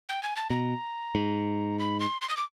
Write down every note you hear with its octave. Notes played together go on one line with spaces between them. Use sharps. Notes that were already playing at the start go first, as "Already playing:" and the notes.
G5
G#5
A5
B2 A#5
G#2
B5
C6
C6
D#6
D6